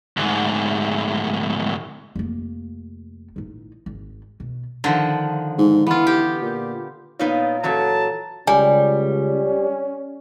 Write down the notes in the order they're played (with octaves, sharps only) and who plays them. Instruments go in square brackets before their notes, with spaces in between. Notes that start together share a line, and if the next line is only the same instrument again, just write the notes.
[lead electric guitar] D2 G#2
[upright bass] F1 A#3
A1 D#4
G#1
B2
[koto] D3 D#3 F3
[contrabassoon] G#2
[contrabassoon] E3 [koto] B3 F4
[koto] G4
[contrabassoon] A#2
[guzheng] A#2 A#3 [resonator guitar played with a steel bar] B3 D#4 F4 [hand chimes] C#5
[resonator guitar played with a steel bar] E3 F#3 C#4 [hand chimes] A4 C#5 A#5 [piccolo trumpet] A5
[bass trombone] C#2 [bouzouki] G3 [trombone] C#4 [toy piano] G#5